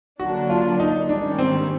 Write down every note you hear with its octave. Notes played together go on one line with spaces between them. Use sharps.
D3 F#3 A#3 D4 F#4
F4
D#4
G#2 D#3 G3 A#3 C#4 D4
C4